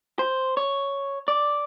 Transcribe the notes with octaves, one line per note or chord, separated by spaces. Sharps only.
C5
C#5
D5